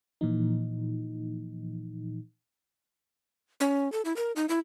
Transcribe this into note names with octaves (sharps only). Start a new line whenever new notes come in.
A#2 E3 F3 D#4
C#4
A4
E4
A#4
D#4
E4